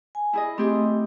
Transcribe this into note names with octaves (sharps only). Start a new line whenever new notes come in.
G#5
E4 G#4 D#5
A3 C4 G4 G#4 D#5